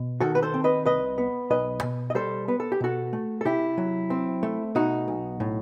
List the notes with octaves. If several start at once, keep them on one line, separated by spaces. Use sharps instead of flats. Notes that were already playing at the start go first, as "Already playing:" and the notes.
Already playing: B2
D#3 F#4 A4
B4
A4 C5
C4
B4 D#5
C2 B4 D#5
B3
B1 B4 D#5
B2
D#5
G3 A4 C5
B3 B4
A4
G4
B2 F#4 A4
A3
A4
C3 E4 G4
F#3
C4
A3
B2 D#4 F#4
B1
A2